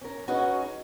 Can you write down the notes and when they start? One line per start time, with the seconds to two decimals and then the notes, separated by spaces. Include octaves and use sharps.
0.01 C#4 A#4
0.28 C#4 D#4 F#4 G#4 B4